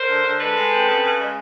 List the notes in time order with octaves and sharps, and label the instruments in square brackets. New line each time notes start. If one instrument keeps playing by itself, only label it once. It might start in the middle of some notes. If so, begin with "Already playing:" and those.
Already playing: [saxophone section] A#4 C5
D3
D3
G#3 A4 B4
G#3
C4
C#3
C#3
G#3